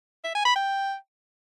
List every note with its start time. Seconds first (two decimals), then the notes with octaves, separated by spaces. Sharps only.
0.24 E5
0.35 G#5
0.45 B5
0.56 G5